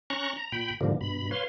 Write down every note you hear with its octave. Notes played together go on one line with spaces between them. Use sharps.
C#4 A#5 C#6 F#6
A#5
A#2 G5 B5
G#2 B2 D3 F3 G3 A#3
G2 B2 B5
B4 C#5 F5 C6